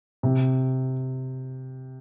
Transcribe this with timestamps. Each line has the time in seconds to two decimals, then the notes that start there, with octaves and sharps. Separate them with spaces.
0.23 C3